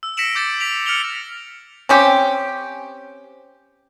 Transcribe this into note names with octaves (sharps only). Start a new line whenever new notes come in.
E6
A#6 B6 C#7 D7 E7 F#7
D6 G6 A6 E7
B6 D7 F7 F#7
F6 C#7 F7 G7
C4 C#4 G4